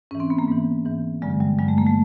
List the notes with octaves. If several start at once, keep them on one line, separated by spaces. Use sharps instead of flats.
G#2 E3 C#4
C4
B3
A#3
G#2 E3
G#2 E3
G2 D3 F#3 G#3
G3
G2 D3 F#3 G#3
A3
A#3
A3